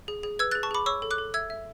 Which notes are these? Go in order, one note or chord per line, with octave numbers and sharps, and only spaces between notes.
G#4
G#4
B4 E6 G#6
G#4 F#6 A6
A5 C#6
G#4 B5 D6
C#5 C#6 E6
A4
D6 F#6
A4
E5 E6 G#6
E5